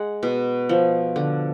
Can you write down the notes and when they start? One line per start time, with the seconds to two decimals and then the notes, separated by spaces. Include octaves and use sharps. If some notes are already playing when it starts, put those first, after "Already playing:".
Already playing: G#3 F#5
0.23 B2
0.69 F3
1.16 D3